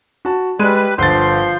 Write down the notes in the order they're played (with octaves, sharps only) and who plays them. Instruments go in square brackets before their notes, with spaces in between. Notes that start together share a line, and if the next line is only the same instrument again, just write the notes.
[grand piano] F#4 A5
[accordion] G3 B4 [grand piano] G#3 D#7
[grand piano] G1 A6 [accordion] F3 C6 G6